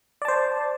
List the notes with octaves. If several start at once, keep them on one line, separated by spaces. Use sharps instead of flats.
C5 D5 A5